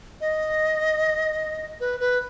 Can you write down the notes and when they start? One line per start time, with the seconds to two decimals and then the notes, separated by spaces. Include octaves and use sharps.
0.21 D#5
1.80 B4
2.00 B4